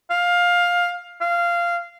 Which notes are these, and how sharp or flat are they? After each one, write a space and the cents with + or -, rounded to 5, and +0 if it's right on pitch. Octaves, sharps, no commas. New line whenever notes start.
F5 +15
F5 -15